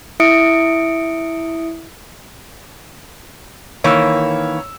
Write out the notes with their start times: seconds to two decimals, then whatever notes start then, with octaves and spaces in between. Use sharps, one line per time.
0.20 E4 E5 D#6 C#7 D7
3.84 D#3 E3 A#3 C#5 E6